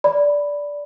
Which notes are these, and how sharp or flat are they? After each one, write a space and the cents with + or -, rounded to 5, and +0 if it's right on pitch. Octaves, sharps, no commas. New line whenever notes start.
D5 -10 B5 +0